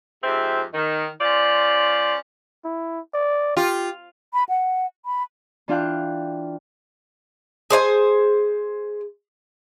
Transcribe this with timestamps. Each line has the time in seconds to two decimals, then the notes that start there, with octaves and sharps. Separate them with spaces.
0.24 F2 G#2 C4 G4 E5
0.74 D#3
1.20 C#4 F4 C5 D5
2.65 E4
3.14 D5
3.57 F4 G4
4.34 B5
4.49 F#5
5.05 B5
5.68 E3 D4 F4 F5 G5 F#6
7.70 G#4 C5 D5 G#5